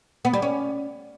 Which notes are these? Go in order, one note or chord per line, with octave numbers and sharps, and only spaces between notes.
B3
G3
C#4